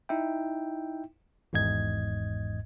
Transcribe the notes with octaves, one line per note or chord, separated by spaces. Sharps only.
D#4 E4 E5 G5
G#1 E2 G#2 D#5 G#6